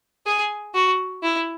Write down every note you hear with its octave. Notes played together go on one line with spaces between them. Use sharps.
G#4
F#4
E4